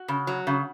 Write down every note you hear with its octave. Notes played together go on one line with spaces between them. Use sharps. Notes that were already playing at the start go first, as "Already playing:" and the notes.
Already playing: F#4
C#3
F#3
C#3